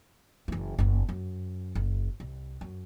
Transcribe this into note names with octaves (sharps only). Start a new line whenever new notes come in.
F#1 E3
F#1 B3
F#2
F#1
C2
F#2